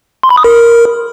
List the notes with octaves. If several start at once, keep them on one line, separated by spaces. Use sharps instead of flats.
C6
B5
D#6
A#4